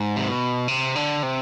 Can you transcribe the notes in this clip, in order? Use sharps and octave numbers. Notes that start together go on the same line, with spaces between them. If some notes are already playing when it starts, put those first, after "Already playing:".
Already playing: G#2
C3
B2
C3
D3
C3